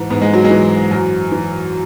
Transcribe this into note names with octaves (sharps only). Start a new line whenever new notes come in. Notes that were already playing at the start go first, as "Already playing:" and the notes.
Already playing: G#2 E3
G#2 B3
G#3
F#3
G#3
E3
F#2
E3